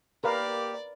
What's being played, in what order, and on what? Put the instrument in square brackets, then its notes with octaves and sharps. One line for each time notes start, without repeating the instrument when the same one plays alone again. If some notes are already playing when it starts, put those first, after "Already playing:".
[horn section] A#3 G4 [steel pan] A#4 B4 F5 [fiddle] D5